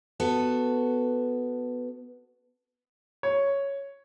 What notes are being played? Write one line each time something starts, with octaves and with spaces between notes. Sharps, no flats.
B3 F#4 A4
C#5